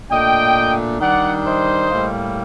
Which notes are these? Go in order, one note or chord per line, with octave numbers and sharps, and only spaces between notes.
A#2 A3 D4 D#5 G5
D#3 G3 D4 D5 F#5
C5 D#5
A2 G3 A#3